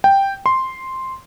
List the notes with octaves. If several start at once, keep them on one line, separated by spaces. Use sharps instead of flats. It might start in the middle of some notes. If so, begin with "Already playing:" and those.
G5
C6